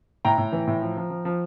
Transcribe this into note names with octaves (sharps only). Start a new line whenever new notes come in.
A2 G5 A#5
A2
E3
A2
F3
F3
F3
F3